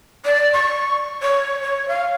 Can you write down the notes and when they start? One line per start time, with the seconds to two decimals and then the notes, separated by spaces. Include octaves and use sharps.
0.25 D5
0.53 C#6
1.22 C#5
1.61 C#5
1.88 F5